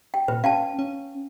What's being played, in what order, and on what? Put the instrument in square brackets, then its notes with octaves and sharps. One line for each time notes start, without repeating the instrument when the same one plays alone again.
[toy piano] G5
[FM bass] A#2 [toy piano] B4
[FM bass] C#4 [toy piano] F5 G5 A5
[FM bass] C#4